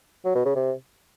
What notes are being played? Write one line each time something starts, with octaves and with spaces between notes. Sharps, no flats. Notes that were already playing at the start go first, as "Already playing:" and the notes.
F#3
B2
C#3
C3